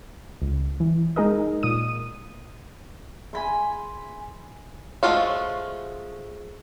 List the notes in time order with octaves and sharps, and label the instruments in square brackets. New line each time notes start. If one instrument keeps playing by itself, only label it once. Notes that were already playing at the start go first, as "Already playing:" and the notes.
[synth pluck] C#2
E3
G#3 D#4 G#4 A#4 D#5
A#2 D#6 D#7
[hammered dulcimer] G#5 B5 C6
[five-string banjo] F3 G#3 A3 F4 F#4